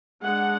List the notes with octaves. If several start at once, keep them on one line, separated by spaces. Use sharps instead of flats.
G#3 D4 F#5